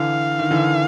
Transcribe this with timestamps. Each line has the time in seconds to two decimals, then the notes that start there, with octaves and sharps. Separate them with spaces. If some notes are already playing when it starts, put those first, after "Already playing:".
Already playing: D3 E3 F5
0.39 D#3
0.51 D3 E3